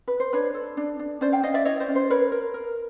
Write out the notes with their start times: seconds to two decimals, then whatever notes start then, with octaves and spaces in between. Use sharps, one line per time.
0.08 B4
0.20 C5
0.33 D4 B4 C#5
0.55 A4
0.77 D4
0.99 D4
1.21 C#4 C5 D5
1.32 F5 G5
1.43 C#4 D#5 F5
1.54 D5 E5
1.65 E4 C#5 D#5
1.80 C5 D5
1.88 C#4
1.95 C5
2.10 A#4 B4 C#5
2.32 A#4
2.54 A#4